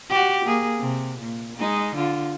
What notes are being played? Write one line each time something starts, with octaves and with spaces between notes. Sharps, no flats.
F#4 G4
A#3 G#4
C3
A#2
G#3 D#4
D3 F4